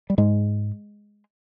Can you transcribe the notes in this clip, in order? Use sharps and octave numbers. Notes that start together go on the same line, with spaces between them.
G3
G#2 G#3